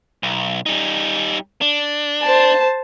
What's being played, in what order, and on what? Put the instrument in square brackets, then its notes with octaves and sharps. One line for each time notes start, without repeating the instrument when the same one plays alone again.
[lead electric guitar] B1
G3 D#4
D4
[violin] C5 A5